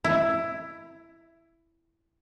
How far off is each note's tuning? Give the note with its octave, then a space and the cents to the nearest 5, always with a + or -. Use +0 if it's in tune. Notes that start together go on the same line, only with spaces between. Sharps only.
E4 +10